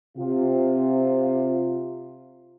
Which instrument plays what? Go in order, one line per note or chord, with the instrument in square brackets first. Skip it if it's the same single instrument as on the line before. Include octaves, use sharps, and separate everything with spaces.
[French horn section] C3 F4